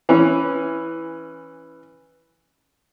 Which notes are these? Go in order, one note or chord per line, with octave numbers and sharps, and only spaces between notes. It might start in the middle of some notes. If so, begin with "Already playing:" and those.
E3 C#4